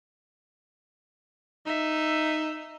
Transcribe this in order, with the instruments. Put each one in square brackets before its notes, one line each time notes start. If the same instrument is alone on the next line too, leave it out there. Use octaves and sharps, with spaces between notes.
[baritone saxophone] D#4 [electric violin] E5